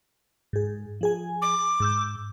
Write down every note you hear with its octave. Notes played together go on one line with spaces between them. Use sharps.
G#2 G#4
F3 G#4 G#5
D6
G#2 E6 G6